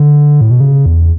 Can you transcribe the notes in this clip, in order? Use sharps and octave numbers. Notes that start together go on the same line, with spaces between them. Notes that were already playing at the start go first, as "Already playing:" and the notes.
Already playing: D3
A2
B2
C#3
E2